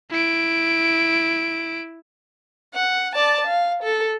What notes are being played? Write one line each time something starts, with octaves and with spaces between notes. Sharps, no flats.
E4 D7
F#5
D5 A5
F5
A4